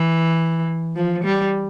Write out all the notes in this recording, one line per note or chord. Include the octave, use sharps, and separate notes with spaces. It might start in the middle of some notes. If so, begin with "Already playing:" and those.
Already playing: E3
F3
G3